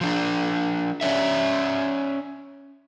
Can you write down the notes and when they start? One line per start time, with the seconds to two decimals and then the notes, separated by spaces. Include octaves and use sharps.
0.01 F3 D4
1.01 C#4 C#5 D5 E5